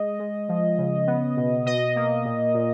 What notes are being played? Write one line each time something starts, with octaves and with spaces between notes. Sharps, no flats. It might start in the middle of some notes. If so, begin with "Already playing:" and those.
Already playing: G#3 D#5
G#3
F3
C#3
B3
B2
B2 D#5
A#3
A#2
A#2